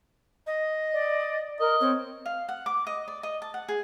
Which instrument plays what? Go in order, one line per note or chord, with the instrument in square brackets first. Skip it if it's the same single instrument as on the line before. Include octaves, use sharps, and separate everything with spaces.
[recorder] D#5
[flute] D5
[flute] A#4 [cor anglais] D#5
[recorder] C4 [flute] C#5
[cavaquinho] F5
F#5
D6
D#5
D5
D#5
A5
F#5
G#4